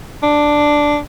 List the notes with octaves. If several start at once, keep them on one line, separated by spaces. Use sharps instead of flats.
D4